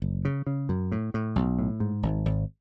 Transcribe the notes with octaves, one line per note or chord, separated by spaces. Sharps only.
F#1
C#3
C#3
F#2
A2
A2
B1
A2
G#2
G#1
G#1